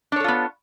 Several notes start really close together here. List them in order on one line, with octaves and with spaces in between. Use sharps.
D4 C#5 A4 F4 B3